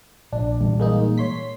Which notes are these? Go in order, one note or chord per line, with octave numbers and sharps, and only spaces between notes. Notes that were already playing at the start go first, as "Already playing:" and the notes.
A#1 D4
A#2 E3 G3
G#3 A#3 D#4
C#5 C6 B6